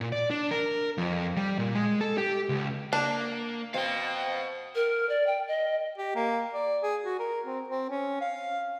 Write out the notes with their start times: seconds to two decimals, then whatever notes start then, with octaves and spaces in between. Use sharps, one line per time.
0.01 A#2
0.12 D5
0.30 D4
0.51 A#4
0.98 F2
1.37 G3
1.58 A#2
1.75 G#3
2.01 A4
2.18 G4
2.49 C#2
2.93 A#3 D4
3.74 B2 C4 F5 G5
4.75 A#4
5.09 D5
5.26 G5
5.47 D#5
5.98 G4
6.15 A#3
6.53 D5
6.83 G#4
7.04 F#4
7.19 A#4
7.45 C4
7.68 C4
7.90 C#4
8.21 F5